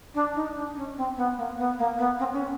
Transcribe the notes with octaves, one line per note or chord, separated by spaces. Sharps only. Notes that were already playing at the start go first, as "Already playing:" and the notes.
D4
D#4
D4
C#4
C4
B3
A#3
B3
A#3
B3
C4
C#4